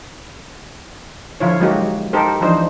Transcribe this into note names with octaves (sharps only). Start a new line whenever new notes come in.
D3 F3 E4 F4 C#5
F#3 G#3 A#3 D#4 F#4 G4
D#4 G4 A4 A#4 C5
E3 F3 D4 D#4 C5